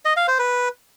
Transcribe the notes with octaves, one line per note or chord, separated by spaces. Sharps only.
D#5
F5
C5
B4